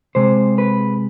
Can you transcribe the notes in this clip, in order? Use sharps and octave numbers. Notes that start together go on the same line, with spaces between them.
C3 G#3 C5
B4